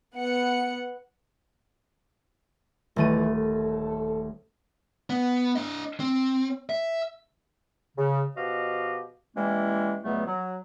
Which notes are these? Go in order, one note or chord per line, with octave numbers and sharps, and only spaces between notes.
B3 F#5 C#7
D#1 E3 A3 D#7
A4
B3
D4 D#5
C4
E5
C#3
B2 F3 F#4 G4 D#5 F5
E3 G3 G#3 A#3 C#4 E4
C#2 B2 F#3 G3 A3 B3
F#3